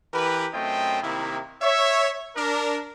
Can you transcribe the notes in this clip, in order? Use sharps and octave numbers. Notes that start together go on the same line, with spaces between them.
E3 G4 A#4 B4
F#2 A3 C4 F4 D#5 G5
C3 D#3 A#3 E4
C#5 E5
D4 A#4